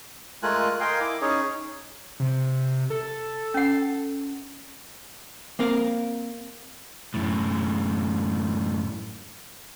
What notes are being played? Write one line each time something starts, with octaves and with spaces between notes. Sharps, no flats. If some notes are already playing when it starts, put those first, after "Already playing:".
G#3 A3 F4 A#4 G#5 F#6
A#4 D#5 F5 G5 G#5 C6
E4 D6
C#4 D#4 G#4 C#5
C3
A4
C#4 F#5
A#3 C4 A#4 F5
F#2 A2